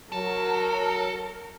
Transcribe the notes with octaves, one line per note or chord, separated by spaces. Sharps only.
F#3 A4 A#4